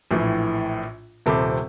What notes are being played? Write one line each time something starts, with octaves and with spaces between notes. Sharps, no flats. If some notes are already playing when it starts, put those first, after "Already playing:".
A#1 A2 E3
D#1 C3 C4 A4 B5 D6